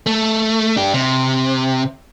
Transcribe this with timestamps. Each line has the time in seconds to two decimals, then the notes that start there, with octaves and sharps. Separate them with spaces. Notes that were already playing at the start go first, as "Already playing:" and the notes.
0.07 A3
0.76 D4 G4
0.94 C3